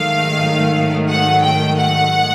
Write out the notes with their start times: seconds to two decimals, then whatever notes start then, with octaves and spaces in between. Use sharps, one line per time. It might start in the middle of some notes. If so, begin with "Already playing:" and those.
Already playing: G#2 D#3 F#3 A3 F5
1.08 F#5
1.43 G5
1.78 F#5